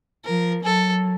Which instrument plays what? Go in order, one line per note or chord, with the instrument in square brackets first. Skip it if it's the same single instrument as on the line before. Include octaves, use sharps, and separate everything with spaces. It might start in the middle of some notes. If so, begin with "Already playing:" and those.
[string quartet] F3 [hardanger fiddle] A#4
[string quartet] F#3 [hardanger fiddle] A4